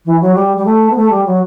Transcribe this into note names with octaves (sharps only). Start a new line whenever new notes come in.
E3
F#3
G3
G3
A3
B3
A3
G3
F#3